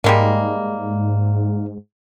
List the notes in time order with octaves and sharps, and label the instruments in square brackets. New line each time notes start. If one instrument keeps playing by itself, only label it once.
[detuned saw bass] G#2 [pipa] G3 G#3 A#3